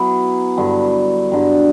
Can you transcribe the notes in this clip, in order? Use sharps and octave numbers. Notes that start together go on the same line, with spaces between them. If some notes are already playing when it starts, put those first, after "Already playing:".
Already playing: F#3 B3 E4
G2 D3 F#3
G2 D3 F#3